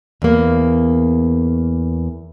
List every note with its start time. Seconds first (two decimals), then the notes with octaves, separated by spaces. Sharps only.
0.22 E2 A#3